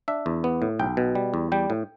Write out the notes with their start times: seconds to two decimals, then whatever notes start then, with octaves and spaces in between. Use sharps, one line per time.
0.08 D4 E5
0.26 E2
0.44 B3
0.62 A2
0.80 B1 G5
0.97 B2
1.15 G3
1.34 E2
1.52 G3 G5
1.70 A2